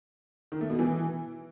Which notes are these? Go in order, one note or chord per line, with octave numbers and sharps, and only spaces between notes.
D#3
A3
B2
E3